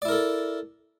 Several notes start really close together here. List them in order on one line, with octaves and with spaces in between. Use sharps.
D5 E4 A#4 A4